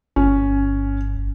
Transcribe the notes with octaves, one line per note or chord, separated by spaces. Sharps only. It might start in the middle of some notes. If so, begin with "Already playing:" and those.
G1 C#4